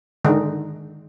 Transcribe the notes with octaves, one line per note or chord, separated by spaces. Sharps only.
D3 D#3 G#3 D#4